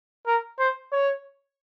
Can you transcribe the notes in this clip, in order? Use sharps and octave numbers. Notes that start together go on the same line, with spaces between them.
A#4
C5
C#5